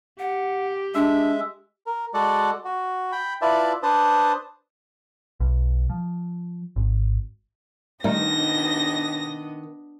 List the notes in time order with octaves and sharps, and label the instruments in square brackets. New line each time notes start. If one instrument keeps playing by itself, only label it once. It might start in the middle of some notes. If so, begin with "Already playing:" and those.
[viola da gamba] G4 [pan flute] F#5
[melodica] G#3 E5 [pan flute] D4
[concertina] A#4
G#3 F#4 A4 D5 F#5
F#4
G5 B5
E4 F4 B4 D5 E5 A5
D4 B4 C5 A5 D#6
[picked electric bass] B1
F3
G#1
[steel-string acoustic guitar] D#3 [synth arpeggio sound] G3 A3 D#4 [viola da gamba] B3 D4 D#5 [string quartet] A#6